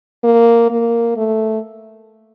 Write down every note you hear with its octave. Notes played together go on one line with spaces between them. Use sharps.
A#3
A#3
A3